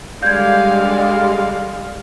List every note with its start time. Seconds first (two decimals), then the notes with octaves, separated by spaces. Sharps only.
0.23 D3 G3 G#3 D5 F5 G6 G#6